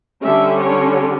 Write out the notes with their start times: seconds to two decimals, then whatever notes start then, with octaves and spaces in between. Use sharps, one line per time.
0.23 D3 G3 C#4 E5
0.60 C#5